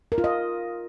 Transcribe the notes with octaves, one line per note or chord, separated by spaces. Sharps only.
A#4
F4
D#5